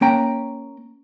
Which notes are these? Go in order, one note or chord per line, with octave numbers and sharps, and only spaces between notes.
A#3 C#4 G5 A#5